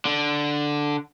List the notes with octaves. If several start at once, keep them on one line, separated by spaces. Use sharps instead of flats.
D3